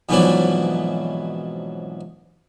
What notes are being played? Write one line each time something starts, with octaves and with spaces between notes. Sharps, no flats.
F2 G#2 B2 E3 F#3 D4